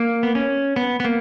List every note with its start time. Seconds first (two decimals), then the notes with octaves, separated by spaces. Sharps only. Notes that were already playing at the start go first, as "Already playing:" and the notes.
Already playing: A#3
0.23 B3
0.35 C#4
0.76 B3
1.00 B3
1.05 A#3